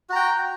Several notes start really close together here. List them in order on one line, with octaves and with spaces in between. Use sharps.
F#4 A#5 G5